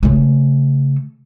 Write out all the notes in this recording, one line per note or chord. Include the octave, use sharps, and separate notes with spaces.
C#3 A3